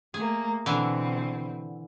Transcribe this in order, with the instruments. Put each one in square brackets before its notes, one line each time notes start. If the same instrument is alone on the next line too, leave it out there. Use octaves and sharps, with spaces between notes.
[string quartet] A3 A#3 [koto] G#4
[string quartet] B2 C4 [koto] D3 E3